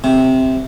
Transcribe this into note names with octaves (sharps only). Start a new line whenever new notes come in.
C3